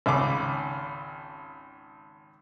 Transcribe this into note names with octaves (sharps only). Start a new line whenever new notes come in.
G#1 C#2 D6